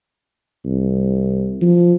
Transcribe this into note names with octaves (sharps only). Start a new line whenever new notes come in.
C2
F3